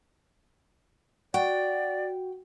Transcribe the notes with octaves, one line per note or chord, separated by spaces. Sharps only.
F#4 D5 G5